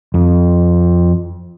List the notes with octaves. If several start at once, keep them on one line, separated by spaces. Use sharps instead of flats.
F2